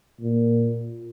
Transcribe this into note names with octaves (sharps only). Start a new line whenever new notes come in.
A#2